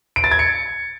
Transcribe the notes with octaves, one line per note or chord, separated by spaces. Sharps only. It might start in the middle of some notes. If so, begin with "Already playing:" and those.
D7
A6
G#6
C#7